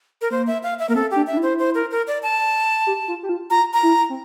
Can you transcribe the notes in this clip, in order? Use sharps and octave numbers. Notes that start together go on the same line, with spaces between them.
A#4
A#3 C5
E5
F5
E5
A#3 A#4
C4 A4
D4 G4
E5
D4
E4
C5
C5
A#4
A#4
D5
A5
G4
F4
G4
F4
F4 A#5
A#5
E4
C4